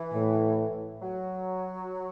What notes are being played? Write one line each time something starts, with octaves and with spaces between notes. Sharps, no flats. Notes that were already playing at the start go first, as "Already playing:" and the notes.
Already playing: E3
A2
F#3